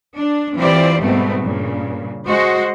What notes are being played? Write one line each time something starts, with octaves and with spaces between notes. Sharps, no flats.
D4
E3 C4 F4 G4 C5 D5
G#2 B2 G3 A3 B3 C4
G2 A#2 C#3
G#3 F#4 C5 D#5